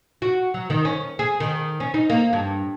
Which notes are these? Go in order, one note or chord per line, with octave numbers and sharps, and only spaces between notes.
F#4
F#3
D#3
C#4
G#4
D#3
C#4
D#4
A#3
G2